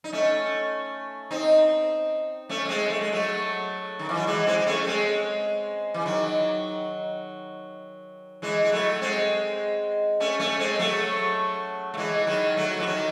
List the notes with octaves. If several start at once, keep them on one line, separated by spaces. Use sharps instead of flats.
D#4
A3 C#4
C4 D#4
A3 C#4
A3
G#3 C4
A3
G#3
F#3 A3
D#3
E3
F#3
E3 G#3
G#3 C4
C4
A3 C#4
A3
G#3 C4
E3
D#3 F#3
E3 G#3
G#3
F#3 A3
G#3 C4
A3 C#4
A3 C#4
G#3 C4
F#3 A3
A3
E3 G#3
D#3 F#3
F#3 A3
E3
D#3 F#3